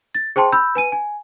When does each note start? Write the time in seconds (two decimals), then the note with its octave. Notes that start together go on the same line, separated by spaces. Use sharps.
0.15 A6
0.36 G#4 C5 G5 A5 C6
0.52 B5 E6 G6
0.75 B4 G#5 D#7
0.92 G#5